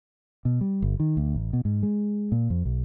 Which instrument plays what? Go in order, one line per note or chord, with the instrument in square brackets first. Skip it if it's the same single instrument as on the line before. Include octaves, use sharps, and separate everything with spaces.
[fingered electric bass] B2
G3
G1
D#3
D2
A1
B2
G#2
G#3
A#2
F2
B1